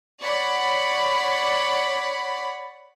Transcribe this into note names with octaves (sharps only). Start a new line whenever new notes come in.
C#5 D5 F#5 B5